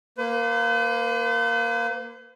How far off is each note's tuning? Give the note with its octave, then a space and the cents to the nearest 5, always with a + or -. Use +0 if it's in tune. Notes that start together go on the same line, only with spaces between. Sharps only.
A#3 +0 B4 +45